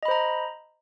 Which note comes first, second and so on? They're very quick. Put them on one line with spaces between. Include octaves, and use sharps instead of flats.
D#5 B5 C5 A#5